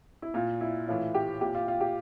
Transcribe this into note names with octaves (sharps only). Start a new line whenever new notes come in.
E4
A#2 F4
E4
A2 E3 F4
G4
A#2 G4
F4
F4
G4